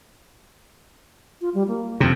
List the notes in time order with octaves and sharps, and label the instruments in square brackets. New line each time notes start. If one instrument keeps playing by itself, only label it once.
[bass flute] F4
G3
A#3
[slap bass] F2 C3